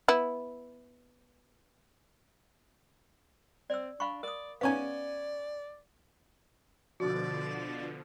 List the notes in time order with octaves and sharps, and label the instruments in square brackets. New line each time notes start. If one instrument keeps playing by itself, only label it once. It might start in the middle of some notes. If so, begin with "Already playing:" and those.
[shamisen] B3 E4
[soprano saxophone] C4 [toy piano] D5 E6
[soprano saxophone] D4 [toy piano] F5 B5 C#6
[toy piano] A#4 D#6 [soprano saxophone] D5
[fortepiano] B3 C#4 G#5 [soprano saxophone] D5 [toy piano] F5
[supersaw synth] B2 D3 F3 [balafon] F#4 [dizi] D5